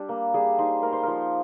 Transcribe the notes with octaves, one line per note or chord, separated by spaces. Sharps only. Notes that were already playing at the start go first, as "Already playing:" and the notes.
Already playing: G3 D4
A#3
G3 G#4
D#4 C5
A#3 A#4
C5
F3 A#4